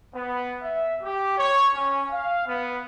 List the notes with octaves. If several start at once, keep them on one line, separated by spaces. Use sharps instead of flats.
B3
E5
G4
C#5
C#4
F5
B3